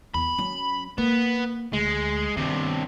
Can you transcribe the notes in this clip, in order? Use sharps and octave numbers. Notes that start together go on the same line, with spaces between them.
E2 B5
F#3 C#4
A#3 B3
D2 G#3
G2 C3 D#3 B3